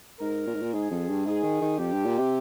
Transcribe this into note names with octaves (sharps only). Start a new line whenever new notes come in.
G#2 A#4
A#2
G#2
A#2
G#2 G#4
F2
G2
G#2 G#4
D#3
D#3
F2 G4
G2
A#2
C3